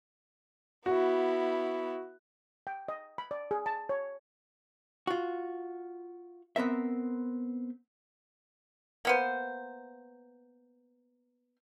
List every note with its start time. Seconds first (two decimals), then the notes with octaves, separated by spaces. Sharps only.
0.86 B3 E4 F#4
2.67 G5
2.88 D#5
3.18 B5
3.31 D5
3.51 G#4
3.66 A5
3.89 C#5
5.07 F4 F#4
6.56 B3 C4 A#4 E5
9.05 A#3 B3 C5